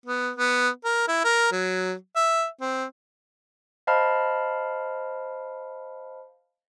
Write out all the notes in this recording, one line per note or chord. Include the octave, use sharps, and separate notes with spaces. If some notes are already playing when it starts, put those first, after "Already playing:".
B3
B3
A#4
E4
A#4
F#3
E5
C4
C5 D#5 F5 A5 B5 F6